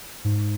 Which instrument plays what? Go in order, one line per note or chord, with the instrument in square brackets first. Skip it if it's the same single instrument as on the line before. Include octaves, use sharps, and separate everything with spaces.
[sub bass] G#2